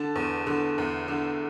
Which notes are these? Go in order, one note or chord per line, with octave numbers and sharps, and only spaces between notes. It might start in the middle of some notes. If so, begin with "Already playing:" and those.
Already playing: D3 A5
E2
D3
E2
D3